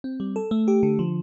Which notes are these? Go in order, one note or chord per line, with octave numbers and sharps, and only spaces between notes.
C4
G3
A4
A3
G4
D3
F3